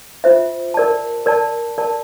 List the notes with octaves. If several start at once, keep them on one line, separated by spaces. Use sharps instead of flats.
F4 C5 E5
A#4 D5 A5
A#4 D5 A5
A#4 D5 A5